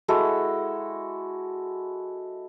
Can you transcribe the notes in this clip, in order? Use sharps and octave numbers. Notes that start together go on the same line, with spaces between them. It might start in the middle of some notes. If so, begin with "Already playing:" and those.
G#3 E4 F#4 A4